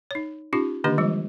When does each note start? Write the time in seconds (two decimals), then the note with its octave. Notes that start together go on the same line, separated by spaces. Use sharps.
0.11 D#4 C#5
0.53 C#4 D#4 F4 G4
0.84 D3 D#3 A#3 D4 G4 D#5
0.98 E3 G3 G#3 F4